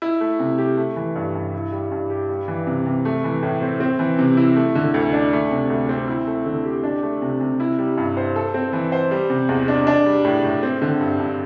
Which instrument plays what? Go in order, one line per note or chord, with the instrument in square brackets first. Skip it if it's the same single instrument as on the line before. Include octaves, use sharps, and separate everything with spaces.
[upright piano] E4
A3
C3
G4
A3
E3
G2
G2
E4
G3
G2
G4
G3
E3
C3
C3
A3
E3
A2
C4
C4
E3
C3
E4
A3
D3
D2
D4
A3
C3
D2
C4
E4
A3
D3
G4
D4
A3
C3
C3
E4
G3
G2
C5
A4
C4
E3
C5
G3
C3
E2
D4
D4
G3
A2
A2
C4
D3
G2
G2